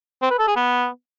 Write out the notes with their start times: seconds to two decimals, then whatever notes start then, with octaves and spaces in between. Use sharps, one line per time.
0.22 C4
0.31 B4
0.39 A4
0.48 G#4
0.56 B3